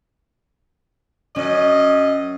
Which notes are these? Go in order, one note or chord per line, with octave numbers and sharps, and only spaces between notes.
F#2 C#4 D#5